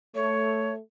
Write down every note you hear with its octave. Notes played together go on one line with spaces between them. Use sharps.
A3 C#5